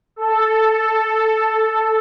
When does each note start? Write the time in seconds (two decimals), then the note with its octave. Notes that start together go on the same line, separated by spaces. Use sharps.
0.16 A4
0.58 A4